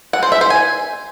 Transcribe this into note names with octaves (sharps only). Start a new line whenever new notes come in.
F#5
C5
E5
C5
G#5